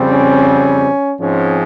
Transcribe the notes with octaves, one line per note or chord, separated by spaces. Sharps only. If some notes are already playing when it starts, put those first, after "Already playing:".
Already playing: F2 C#3 G3 C4
C#4
G#2 F3 G#3 C4 C#4